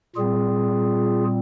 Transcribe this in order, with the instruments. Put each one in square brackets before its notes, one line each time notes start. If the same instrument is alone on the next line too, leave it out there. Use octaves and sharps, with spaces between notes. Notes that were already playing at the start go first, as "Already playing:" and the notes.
[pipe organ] A#2 G3 C4 F4 G#4